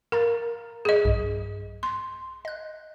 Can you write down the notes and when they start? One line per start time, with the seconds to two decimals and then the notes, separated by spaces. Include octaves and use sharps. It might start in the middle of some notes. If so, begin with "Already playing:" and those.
0.12 A#4 F5 A#5 A6
0.85 G#4 D#5
1.05 B1 G2
1.83 C6
2.45 D#5 F#6